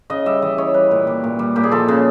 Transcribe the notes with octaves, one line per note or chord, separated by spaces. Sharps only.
C#3 D#5
G3 E5
E3 D#5
C#3 C#5
G3 B4
A#2
G3
A#2
G3
A#2 G4
G#4
F3 A4
C#3 G#4